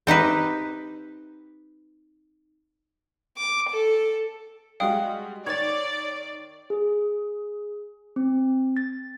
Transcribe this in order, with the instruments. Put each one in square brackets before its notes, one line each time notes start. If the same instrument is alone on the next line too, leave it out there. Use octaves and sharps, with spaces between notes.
[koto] C4 D#4 G4 B4
[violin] D6
A4
[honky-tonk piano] G3 G#3 F#4 [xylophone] F5 G5 D#6
[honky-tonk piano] D#3 C#5 C#7 [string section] D5 [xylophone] G#6 A6
[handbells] G#4
C4
A6